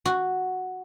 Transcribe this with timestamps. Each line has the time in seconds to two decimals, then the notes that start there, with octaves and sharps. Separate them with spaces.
0.05 F#4